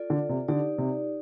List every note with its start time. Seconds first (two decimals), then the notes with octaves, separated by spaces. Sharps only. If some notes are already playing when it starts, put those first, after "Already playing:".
Already playing: F4 A4 D5
0.10 D3
0.29 C3
0.48 D3 D#4 G4 D5
0.78 C3